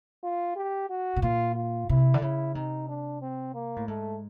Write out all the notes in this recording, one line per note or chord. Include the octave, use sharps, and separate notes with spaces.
F4
G4
F#4
B2
A#2 F4
F4
C3 E4
D3
C#3 E4
C3 D#4
D4
C4
A#3
A2
G#2 A3